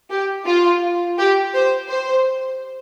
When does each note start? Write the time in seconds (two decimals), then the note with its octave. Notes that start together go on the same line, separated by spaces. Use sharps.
0.11 G4
0.46 F4
1.18 G4
1.54 C5
1.89 C5